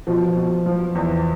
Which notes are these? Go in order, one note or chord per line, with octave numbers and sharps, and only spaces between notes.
B2 F3
B2
F3
E2